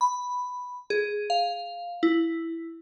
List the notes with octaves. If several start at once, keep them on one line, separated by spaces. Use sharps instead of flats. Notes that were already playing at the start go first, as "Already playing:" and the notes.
B5
G#4
F5
E4